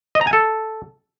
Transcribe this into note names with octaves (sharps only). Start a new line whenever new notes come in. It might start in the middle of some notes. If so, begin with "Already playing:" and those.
D#5
A#5
G#5
A4